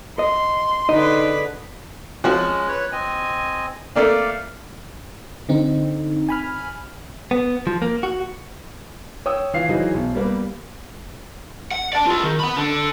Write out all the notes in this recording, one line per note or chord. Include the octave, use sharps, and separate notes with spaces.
D#5 C6
D3 D#4 G#4 B4 D#5
F3 G#3 C#4 F#4
B4 C#5
C4 D#5 G#5
A3 A#3 D4 D5 F5
D3 C4 D#4
G#5 B5 F6
B3
F3
A#3
F#4
C#5 G5 D#6 E6
E3 E4 F4 F5 C7
E3 F#3 D#4 G#4 C5
B1
G3 A#3 B3
F#5
D5 A5
F4 G#4
D#3
F#5 B5
D3